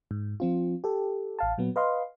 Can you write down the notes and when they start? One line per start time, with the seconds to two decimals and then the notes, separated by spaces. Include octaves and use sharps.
0.11 G#2
0.40 F3 C4 F4
0.84 G4 A4
1.39 A1 F5 A5
1.58 A#2 F#3 B3
1.76 B4 D#5 F5 C6